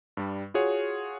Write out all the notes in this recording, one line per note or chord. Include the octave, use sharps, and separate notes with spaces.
G2 G3
F4 F#4 G#4 C#5 F#5